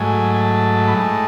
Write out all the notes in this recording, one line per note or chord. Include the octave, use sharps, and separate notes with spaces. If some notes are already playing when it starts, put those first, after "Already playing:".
Already playing: G#2 F#3 A3 G#5
G#5
A5
B5
A2 G#3 A5